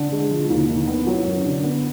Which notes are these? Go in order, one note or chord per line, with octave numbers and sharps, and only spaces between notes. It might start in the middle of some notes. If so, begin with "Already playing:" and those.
Already playing: D3
G#3
F3
D#2
D#3
B3
F#3
F#2
D3
B3